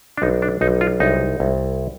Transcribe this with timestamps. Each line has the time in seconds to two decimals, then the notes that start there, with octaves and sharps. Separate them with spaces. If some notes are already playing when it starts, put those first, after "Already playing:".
0.18 D4
0.22 B1 D#4
0.42 D4
0.61 B1 D#4
0.81 F4
1.00 C2 D#4
1.40 C2